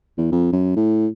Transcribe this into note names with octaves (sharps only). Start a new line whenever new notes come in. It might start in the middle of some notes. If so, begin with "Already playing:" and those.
E2
F2
F#2
A2